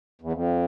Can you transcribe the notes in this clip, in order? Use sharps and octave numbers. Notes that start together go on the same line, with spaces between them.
E2
F2